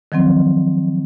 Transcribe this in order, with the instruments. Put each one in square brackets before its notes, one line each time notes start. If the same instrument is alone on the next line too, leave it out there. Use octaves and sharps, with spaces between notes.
[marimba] D#3 F3 F#3 C4